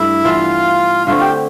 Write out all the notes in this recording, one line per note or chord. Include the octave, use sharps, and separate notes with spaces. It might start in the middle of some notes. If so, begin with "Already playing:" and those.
Already playing: G2 A3 D4 E4 E5
E3 B3 D4 F4 F5
D3 A3 C4 F4 F5
G4 G5